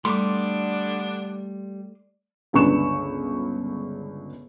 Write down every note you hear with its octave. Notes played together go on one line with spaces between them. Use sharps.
D3 G3 A3 B3 D4 C6 D6
G1 C#2 D4 B4 C#6 E7